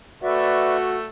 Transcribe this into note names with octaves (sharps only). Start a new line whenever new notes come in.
A3 F#4 B4 D5 E5